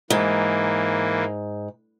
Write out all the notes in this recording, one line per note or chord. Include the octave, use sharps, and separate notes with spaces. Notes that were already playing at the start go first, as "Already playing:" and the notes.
G#2 E3 A#3